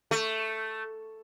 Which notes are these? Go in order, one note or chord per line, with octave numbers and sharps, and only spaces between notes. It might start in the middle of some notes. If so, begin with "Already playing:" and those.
A3